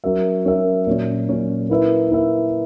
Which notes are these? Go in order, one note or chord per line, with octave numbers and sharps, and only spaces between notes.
F#3 C#4 F#4 A#4 E5
F#3 C#4 F#4 A#4 E5
A#2 F#3 C#4
A#2 F#3 C#4
A#3 E4 B4 E5
A#3 E4 B4 E5